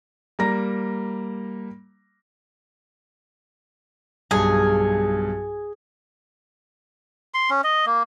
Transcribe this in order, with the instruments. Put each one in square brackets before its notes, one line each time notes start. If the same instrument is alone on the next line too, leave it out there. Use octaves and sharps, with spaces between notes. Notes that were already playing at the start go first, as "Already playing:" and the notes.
[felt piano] G3 A#3 A#5 A#6
[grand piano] B1 G2 [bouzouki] G#4
[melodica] C6
C#4
D#5
A#3